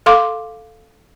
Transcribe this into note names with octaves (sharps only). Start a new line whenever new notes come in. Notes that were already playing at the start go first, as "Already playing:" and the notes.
A4 F5 C6 D6